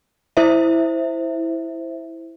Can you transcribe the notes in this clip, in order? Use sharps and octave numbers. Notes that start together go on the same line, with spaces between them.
E4 C5 E5